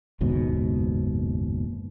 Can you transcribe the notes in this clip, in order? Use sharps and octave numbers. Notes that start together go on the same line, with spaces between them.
F#1 D#2 G#2 B2